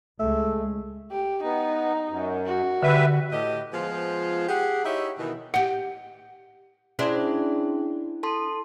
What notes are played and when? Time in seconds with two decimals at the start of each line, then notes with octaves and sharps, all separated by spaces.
0.20 C#2 G#3 A3 E5
1.11 G4
1.43 B3 D#4
2.08 F#2
2.46 F#4
2.83 D3 G3 B4 E5
3.32 A2 G4 D#5
3.74 F3 G#3 B3 F4 C5
4.48 G4 G#4 F#5
4.85 D#4 E4 G4 C#5 D#5 E5
5.19 B2 D#3 E3
5.54 G4 D#5 F#5
6.99 C#4 D4 E4 G#4 C5
8.23 A4 A5 C6